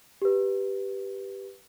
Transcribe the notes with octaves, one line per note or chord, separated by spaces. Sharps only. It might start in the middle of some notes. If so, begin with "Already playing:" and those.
G4 B4